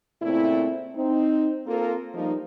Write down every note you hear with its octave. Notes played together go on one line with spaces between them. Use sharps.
A#2 C#3 A3 C4 E4
C4 D#4
A#3 C4 F4 A4 A#4
F3 G3 A#3 D#4